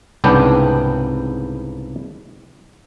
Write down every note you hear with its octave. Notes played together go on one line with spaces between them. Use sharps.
C2 G#2 C#3 B3 D4 G5